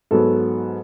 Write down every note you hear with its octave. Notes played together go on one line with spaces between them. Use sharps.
G#2 F#3 B3 A4